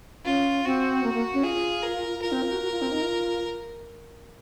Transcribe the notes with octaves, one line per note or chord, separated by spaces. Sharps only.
C#4 F4
C4 F#4
A#3
A#3
C#4
F4 G#4
A#4
F4 A#4
C4
F4
F#4
F#4
F4
C4
D#4
F4